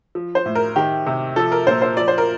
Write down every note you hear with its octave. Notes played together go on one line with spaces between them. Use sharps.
F3
C5
A2
A#4
D#3 G4
C3
F3 A4
A#4
A#2 C5
C5
F3 D5
C5
A#4